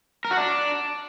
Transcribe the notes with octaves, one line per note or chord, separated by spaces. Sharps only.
A#4
F#4
D4